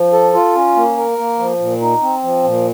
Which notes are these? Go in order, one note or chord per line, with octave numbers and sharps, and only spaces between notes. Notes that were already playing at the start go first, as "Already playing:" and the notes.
Already playing: F3
A4
F4
C#4
A#3
A#4
A#3
F3
A#2
D#4
C4
F3
A#2